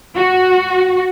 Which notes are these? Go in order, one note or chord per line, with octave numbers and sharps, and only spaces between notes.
F#4